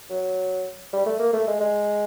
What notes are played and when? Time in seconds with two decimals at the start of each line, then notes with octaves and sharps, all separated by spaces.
0.10 F#3
0.93 G3
1.06 A3
1.19 A#3
1.33 A3
1.48 G#3
1.61 G#3